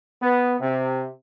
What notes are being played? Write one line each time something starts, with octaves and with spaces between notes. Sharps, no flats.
B3
C3